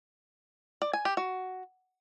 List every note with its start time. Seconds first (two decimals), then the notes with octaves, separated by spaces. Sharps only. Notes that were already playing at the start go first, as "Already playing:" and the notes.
0.82 D5
0.93 G#5
1.05 G4
1.17 F#4